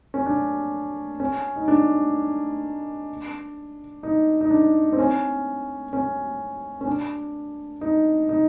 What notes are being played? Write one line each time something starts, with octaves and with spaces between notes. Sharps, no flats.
C#4
D4
C#4
D#4
D4
D#4
D#4
D4
C4
C#4
C#4
C#4
D4
D#4
D#4